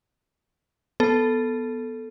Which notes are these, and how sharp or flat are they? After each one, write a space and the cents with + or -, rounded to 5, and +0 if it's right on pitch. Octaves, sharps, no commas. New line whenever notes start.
B3 +0 A4 +0